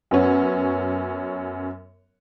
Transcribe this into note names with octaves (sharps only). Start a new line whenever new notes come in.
F#2 B3 C#4